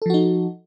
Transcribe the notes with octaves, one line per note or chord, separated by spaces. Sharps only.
F3 D#4 F#4 A4